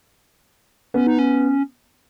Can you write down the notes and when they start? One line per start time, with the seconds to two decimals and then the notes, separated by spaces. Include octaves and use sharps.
0.94 B3 C#4
1.07 D#4
1.19 C#4